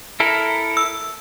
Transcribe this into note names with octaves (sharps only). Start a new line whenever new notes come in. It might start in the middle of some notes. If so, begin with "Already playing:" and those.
E4 A4 A#4
E6